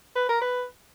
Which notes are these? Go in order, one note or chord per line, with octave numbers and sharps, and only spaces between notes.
B4
A#4
B4